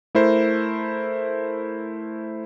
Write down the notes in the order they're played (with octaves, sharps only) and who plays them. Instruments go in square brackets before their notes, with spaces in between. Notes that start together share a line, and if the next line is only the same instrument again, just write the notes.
[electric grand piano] A3 E4 A#4 C5